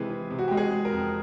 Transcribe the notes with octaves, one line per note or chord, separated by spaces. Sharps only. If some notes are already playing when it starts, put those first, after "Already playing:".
Already playing: C3 E3 G#3 G#4
E3
C3
F#4
G#3 G4
G#4
G#3
A#4
F2